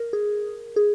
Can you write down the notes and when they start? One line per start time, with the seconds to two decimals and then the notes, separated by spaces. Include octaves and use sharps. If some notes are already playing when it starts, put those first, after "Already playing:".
Already playing: A#4
0.13 G#4
0.76 G#4